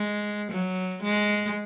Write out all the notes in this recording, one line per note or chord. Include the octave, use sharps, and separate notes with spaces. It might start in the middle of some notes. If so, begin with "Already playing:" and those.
Already playing: G#3
F#3
G#3